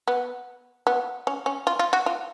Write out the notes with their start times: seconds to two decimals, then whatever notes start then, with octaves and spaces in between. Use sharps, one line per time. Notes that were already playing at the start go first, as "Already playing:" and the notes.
0.08 B3
0.87 B3
1.27 C#4
1.46 C#4
1.67 F4
1.79 F4
1.93 F#4
2.06 F4